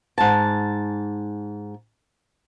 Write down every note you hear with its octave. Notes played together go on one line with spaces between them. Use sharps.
G#2 A5